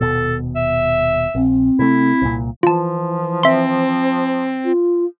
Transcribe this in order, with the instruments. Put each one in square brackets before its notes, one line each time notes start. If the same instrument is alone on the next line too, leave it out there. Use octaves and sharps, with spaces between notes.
[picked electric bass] D#1 B2 [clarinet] A4
[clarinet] E5
[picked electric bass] A#1 [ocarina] C4
[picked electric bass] C3 A3 [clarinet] E4
[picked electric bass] C2 A#2
[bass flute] E3 [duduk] F3 [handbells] F4 A5
[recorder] C4 [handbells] E5 C6
[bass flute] F4